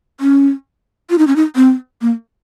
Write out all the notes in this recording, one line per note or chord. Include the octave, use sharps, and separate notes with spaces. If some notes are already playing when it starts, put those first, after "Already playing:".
C#4
F4
D#4
C#4
D#4
C4
A#3